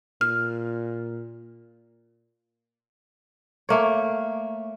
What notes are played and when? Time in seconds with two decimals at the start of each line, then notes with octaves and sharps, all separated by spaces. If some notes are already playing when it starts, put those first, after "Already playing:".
0.21 A#2 F6
3.69 A3 A#3 C#5